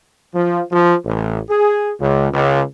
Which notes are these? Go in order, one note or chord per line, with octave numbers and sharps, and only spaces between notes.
F3
F3
A1
G#4
C#2
C#2